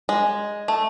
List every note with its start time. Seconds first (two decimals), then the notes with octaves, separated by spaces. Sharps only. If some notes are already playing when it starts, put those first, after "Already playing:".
0.09 G#3
0.68 A3